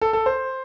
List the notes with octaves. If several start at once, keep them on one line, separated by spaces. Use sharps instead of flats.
A4
A4
C5